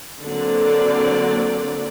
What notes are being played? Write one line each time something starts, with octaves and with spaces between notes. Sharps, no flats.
D3 F#3 A#3 C4 D5